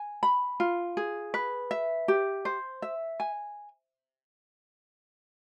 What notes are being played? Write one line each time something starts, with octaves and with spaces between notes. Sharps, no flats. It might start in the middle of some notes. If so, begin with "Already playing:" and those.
Already playing: G#5
B5
F4
G#4
B4
E5
G4
C5
E5
G#5